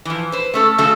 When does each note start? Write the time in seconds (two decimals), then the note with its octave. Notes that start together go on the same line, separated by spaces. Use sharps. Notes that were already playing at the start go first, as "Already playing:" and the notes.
0.05 E3 F3
0.32 B4 C5
0.54 A3 C#4 A4
0.78 C#3 F#3 A3 A4